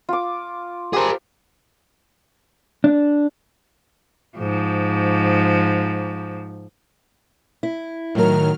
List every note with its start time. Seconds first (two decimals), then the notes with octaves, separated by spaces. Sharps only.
0.09 F4 D6
0.93 G4 G#4 A#4 C5
2.84 D4
4.38 G#2 F3
7.63 E4
8.15 A2 D#3 F#3 A#4 F6